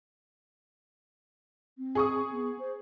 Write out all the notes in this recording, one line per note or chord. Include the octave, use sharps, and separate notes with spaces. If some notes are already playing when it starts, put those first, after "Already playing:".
C4
G#4 C#6 D#6
B3
C5